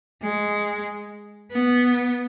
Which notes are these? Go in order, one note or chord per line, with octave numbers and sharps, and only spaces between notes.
G#3
B3